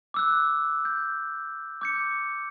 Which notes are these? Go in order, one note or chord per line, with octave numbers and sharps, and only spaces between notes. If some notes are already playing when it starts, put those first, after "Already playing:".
D6 E6 F#6
G6
D6 G6 C#7